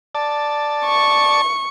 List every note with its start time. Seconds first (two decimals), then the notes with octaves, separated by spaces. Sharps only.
0.15 D5 A5
0.85 C#6